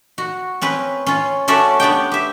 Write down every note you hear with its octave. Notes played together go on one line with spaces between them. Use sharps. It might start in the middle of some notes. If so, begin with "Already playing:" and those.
F#4
C4 C#4 B4
C#4 F4
A3 C#4 F#4 D5 E5
B3 D4 G4 G5
G4 E5